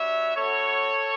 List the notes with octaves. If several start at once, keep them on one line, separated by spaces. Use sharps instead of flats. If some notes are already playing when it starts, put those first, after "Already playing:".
Already playing: G3 D4 F#4 C#5 E5
B3 F#4 A4 C#5